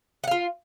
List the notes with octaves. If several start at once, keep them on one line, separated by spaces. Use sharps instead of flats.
F4 F5 F#5